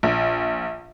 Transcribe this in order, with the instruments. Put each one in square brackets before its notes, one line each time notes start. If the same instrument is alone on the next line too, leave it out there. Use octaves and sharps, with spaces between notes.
[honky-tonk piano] A#1